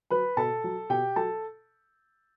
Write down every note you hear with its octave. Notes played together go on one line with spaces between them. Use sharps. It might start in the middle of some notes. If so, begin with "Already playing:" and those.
F#3 B4 B5
B2 A4 A5
F#3
B2 G4 G5
F#3 A4 A5